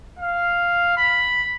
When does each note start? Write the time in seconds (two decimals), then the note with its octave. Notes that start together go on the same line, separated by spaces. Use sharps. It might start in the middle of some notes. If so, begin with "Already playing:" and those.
0.19 F5
0.97 B5